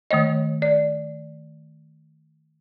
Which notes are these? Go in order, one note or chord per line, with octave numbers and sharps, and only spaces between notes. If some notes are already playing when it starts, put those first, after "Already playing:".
D#3 A3 C#5 D#5
D5